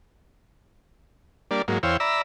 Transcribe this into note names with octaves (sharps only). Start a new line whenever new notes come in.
G3 A#3 D4 D5
G#2 F#3 A#3
E2 C5 C#5 F5 G5 E6
D5 E5 A#5 B5 E6